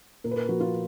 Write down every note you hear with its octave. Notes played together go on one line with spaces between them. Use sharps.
A#2 A#4
B4
A#4
F3 F#4
F4